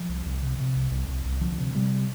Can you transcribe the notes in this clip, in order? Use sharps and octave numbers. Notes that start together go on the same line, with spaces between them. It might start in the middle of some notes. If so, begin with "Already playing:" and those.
Already playing: F3
C2
C2
C3
C3
C2
C2
C2
C2
D2 F3
C3
C3 G3